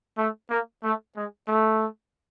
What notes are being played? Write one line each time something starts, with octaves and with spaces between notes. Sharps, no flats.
A3
A#3
A3
G#3
A3